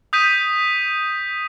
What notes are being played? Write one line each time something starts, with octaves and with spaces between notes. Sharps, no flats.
D#6 G6 B6 D#7